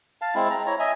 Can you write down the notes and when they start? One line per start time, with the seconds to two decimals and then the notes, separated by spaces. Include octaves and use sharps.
0.22 F5 A5
0.35 G#3 C4 E4
0.50 A#5
0.67 E4 C#5 A#5
0.79 D#5 E5 G#5